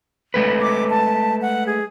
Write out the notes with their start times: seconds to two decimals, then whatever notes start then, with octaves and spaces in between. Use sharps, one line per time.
0.34 G#3 A3 B4
0.61 D6
0.90 A5
1.42 F#5
1.67 G#4